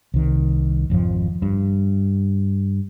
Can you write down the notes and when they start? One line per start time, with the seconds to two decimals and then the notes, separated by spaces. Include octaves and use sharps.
0.14 C2 D#3
0.90 G#1 F2 D#3 F3
1.42 G2